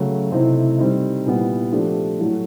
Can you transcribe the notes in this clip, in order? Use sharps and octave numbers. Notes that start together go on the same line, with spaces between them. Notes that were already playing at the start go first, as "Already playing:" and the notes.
Already playing: C#3 F#3 A3
C3 E3 A3 C4 D#4
D#3 G3 C4 D#4
A#2 G3 B3 E4
F3 A3 D4 G4
A2 F#3 A3